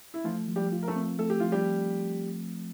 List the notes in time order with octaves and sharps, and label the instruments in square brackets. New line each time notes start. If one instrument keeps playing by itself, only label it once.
[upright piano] E4
[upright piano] F3 F4 [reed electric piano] A3
[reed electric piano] F3
[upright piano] G3 G4
[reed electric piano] F4
[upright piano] A#4
A3 A4
[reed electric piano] C4
[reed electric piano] A3 [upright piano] A4
[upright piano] G4
[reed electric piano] F3 [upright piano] F4
[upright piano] G3 G4